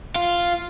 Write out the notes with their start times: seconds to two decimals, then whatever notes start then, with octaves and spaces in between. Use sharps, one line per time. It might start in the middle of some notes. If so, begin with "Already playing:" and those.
0.16 F4